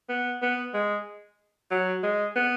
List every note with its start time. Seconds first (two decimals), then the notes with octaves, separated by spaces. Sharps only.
0.09 B3
0.42 B3
0.74 G#3
1.71 F#3
2.03 G#3
2.36 B3